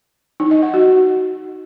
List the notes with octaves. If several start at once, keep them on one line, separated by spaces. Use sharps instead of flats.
D#4
D#5
F#5
F#4